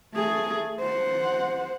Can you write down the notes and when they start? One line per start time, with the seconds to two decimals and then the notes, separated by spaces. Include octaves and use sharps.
0.14 A3 G#4
0.80 C5 F#5